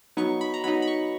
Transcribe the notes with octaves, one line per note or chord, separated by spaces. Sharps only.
F#3 B3 D#4 C#6
B5
A#5
F#3 B3 D#4 B5
B5
C#6